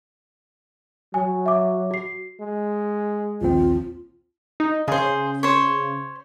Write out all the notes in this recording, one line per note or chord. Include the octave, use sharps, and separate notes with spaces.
F#3 G#5
E5 D6
F#4 C7
G#3
A#1 D#2 C4 F4
D#4
C#3 G#4 C5
C5 C#5